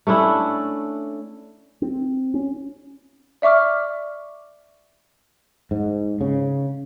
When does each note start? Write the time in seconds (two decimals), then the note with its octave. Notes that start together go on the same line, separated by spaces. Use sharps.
0.07 A3 C#4 D4 E4
1.82 C4
2.34 C#4
3.42 D5 E5 C#6 D6 F6
5.71 G#2
6.21 C#3